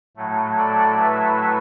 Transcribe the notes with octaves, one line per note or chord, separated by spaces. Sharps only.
A2 F#3 A3
A4 D5
B4 E5